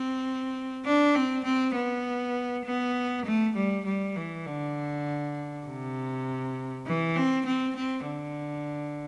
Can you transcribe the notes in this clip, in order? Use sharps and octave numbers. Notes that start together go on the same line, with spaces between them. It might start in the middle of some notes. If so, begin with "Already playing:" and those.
Already playing: C4
D4
C4
C4
B3
B3
A3
G3
G3
E3
D3
C3
E3
C4
C4
C4
D3